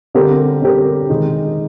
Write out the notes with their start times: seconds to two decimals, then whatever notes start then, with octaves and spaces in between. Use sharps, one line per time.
0.15 D3 G3 C4 G4 A#4
0.62 D3 G3 C4 G4 A#4
1.10 D#3 G#3 D#4